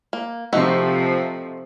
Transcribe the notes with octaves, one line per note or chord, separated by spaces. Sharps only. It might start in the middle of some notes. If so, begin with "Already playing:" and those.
A#3
C3 F3 A3 D#4 F#4